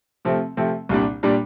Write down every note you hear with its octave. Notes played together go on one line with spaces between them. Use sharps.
C3 F3 A3 C4
C3 F3 A3 C4
C2 A#2 G3 D4
A#2 G3 D4